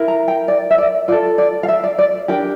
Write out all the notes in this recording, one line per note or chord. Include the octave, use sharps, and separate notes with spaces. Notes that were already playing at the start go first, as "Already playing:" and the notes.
Already playing: E4 A#4
A#5
G5
D5
E5
D5
F4 A4 D5
D5
F5
E5
D5
D5
D4 G4 A#4 G5